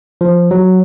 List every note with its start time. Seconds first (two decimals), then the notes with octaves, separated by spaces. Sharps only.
0.21 F3
0.51 F#3